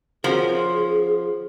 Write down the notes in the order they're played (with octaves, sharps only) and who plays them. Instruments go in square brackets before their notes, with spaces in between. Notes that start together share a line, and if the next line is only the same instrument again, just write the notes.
[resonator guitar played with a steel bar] F3 [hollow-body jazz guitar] C#4 F#4 A#4 [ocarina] G#4